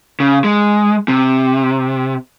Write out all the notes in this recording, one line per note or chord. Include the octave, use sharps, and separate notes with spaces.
C#3
G#3
C3